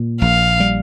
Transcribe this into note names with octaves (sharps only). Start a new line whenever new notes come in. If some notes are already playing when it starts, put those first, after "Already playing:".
Already playing: A#2
A#1 F5
G3